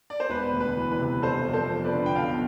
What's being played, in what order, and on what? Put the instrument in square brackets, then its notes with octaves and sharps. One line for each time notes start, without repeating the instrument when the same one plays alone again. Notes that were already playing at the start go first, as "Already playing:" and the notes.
[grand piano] D5
C5
E1 B4
D2
B4
E3
B4
C3
G1 A4 C5
F2
A4 C5
F3
B4 D5
D3
G5
B1 D5 F5